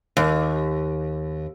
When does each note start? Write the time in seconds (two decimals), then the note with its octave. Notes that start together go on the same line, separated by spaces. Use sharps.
0.17 D#2